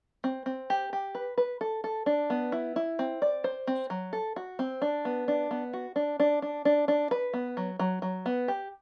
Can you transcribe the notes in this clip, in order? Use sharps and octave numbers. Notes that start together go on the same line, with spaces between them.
C4
C4
G4
G4
B4
B4
A4
A4
D4
B3
E4
E4
C4
D5
C5
C4
F#3
A4
F#4
C4
D4
B3
D4
B3
F#4
D4
D4
D4
D4
D4
B4
B3
F#3
F#3
F#3
B3
G4